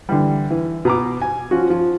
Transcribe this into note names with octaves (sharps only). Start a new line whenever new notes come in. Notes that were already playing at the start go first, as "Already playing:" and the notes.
D3 E3 G3
E3
B2 A#5 D6
G#5
F3 C#4 F#4
F3